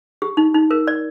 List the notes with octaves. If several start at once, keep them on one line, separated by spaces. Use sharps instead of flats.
G4
D#4
D#4
A#4
D5